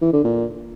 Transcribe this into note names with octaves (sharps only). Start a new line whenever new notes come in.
E3
D3
A#2